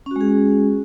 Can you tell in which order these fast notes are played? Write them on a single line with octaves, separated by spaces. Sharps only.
C#4 F#4 G#3 G#4